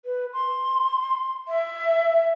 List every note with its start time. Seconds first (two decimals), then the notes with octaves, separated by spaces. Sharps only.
0.05 B4
0.33 C6
1.48 E5